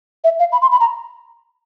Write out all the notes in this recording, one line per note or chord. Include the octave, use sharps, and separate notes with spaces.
E5
F5
B5
C6
B5
A#5